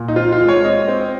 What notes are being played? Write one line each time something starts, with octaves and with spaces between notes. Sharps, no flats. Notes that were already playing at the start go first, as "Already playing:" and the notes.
Already playing: A#2
D#4
C4 F4
F4
G#3
C#5
C4 D#5
C4